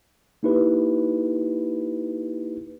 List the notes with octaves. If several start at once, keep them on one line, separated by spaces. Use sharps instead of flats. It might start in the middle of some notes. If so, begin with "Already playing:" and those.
A#3 D#4 E4 G4 B4